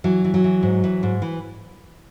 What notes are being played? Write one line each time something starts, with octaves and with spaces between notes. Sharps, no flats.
E3 F#3
E3
F#3
E3
G#2
E3
G#2
E3